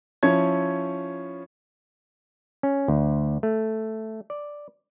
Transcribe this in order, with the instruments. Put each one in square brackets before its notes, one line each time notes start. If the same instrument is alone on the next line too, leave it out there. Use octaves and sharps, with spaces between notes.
[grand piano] F3 C#4 E4 C#5 G#6
[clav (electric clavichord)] C#4
D2
A3
D5